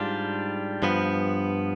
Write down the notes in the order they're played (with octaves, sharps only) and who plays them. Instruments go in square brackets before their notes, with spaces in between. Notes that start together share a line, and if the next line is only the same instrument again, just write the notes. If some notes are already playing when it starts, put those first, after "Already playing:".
Already playing: [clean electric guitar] G#2 G3 D4 F4
G2 F3 B3